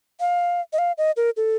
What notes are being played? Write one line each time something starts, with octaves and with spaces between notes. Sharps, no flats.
F5
D#5
F5
D#5
A#4
A4